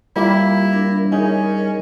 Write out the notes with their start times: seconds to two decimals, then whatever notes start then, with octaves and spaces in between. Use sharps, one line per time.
0.16 G3 A#3 E4 F4 G4
0.71 D4 A#4
1.12 C#4 D#4 G#4 A#4